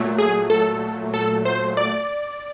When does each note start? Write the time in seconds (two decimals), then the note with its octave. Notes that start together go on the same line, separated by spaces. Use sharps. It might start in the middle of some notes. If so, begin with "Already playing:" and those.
Already playing: A#2 F#3 A3
0.18 G#4
0.50 A4
1.14 A4
1.45 C5
1.77 D5